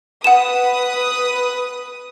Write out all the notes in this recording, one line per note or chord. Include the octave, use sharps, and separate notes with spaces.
B4 F#5 D#6 E7